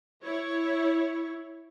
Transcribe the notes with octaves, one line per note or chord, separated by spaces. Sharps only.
E4 C#5